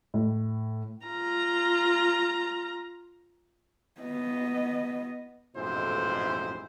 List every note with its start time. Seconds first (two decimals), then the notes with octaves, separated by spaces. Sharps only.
0.14 A2
1.06 F4 A#5
4.01 B3 D#5
5.56 A1 F2 G#2 B2 E4 C5